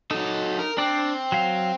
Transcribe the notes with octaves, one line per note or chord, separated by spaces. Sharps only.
F#3 D#4 A4
A#4
C4 D4 D5
F#3 F5